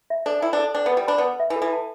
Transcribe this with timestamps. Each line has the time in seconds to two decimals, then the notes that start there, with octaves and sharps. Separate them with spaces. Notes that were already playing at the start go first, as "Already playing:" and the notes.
0.10 E5
0.26 D4 A4
0.42 E4 G5
0.53 D4
0.59 A4
0.75 D4 G5
0.86 B3
0.91 B4
0.97 G3
1.07 D4 B5
1.18 B3
1.24 B4
1.40 E5
1.50 E3
1.56 A4
1.62 E3
1.73 A5